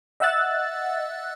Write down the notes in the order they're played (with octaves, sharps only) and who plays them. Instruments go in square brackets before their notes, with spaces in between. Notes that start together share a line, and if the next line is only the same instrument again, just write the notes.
[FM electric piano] D#5 E5 F#5 E6 F#6 A6